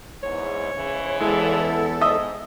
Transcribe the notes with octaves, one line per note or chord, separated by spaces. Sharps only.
E2 G#2 C#5
G#2 C#3 E3
E2 G#3 E4 A4
G#2 D#5 E5